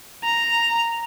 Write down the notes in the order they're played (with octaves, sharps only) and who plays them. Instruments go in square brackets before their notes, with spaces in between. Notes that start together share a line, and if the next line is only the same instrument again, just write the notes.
[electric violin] A#5